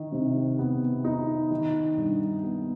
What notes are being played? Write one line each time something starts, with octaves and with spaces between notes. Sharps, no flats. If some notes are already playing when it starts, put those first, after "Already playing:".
Already playing: D#3
C3
B3
D#4
D#3
G2
B3